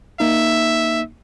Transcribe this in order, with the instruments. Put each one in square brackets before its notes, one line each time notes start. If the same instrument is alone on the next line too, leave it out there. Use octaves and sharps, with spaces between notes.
[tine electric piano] A#3 D#4 [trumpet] E5